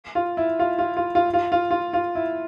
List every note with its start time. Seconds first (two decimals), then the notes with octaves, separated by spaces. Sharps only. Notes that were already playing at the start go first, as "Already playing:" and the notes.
0.15 F4
0.37 E4
0.59 F4
0.78 F4
0.97 F4
1.15 F4
1.34 F4
1.52 F4
1.71 F4
1.93 F4
2.15 E4